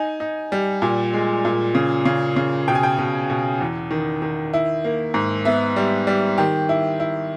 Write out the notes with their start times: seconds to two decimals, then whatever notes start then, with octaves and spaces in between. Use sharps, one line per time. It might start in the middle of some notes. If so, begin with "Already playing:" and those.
Already playing: D#4 G#5
0.20 D#4
0.52 G3
0.82 A#2
1.13 G#3
1.45 A#2
1.75 C#3
2.05 C#3
2.36 C#3
2.68 B2 G5
2.75 G#5
2.83 G5
2.98 B2
3.30 B2
3.61 E2
3.91 D#3
4.22 D#3
4.53 E4
4.84 A#3
5.14 G#2
5.45 B3 E5
5.76 G3
6.07 G3
6.38 D#3 G4
6.69 E4
7.00 E4